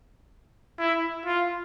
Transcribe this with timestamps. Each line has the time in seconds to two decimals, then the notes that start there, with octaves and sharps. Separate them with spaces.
0.79 E4
1.26 F4